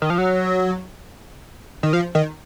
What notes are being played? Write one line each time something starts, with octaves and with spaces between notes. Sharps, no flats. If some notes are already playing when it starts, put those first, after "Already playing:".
D#3
F3
F#3
D#3
F3
D#3